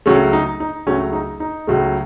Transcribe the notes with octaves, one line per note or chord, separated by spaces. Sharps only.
C#2 C#3 F#3 A3 C#4
D#4
D#4
C#2 C#3 F#3 A3 C#4
D#4
D#4
C#2 C#3 F#3 A3